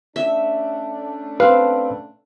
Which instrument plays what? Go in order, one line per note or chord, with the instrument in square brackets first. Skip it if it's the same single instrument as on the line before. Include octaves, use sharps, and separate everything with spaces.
[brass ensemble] A3 C#4 D4 [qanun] E5
[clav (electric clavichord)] C4 F5 [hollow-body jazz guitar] B4